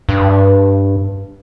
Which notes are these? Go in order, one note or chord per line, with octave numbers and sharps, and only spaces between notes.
G2